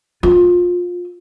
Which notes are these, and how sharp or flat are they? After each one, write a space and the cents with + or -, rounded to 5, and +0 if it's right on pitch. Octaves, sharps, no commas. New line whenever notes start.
F4 +20